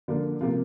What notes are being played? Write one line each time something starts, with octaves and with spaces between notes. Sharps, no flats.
D3 F3 A#3 F4
C3 F3 A#3 F4